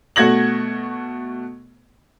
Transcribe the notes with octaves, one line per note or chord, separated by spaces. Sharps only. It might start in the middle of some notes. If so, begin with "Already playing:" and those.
B2 A3 F#4 G#6 A#6 F#7